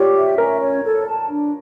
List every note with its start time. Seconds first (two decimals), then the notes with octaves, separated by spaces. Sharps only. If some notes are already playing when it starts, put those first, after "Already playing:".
Already playing: F4 G4 C#5 D5
0.16 E5
0.38 C#4 A#4
0.61 C#5
0.83 A4
1.06 A5
1.29 D4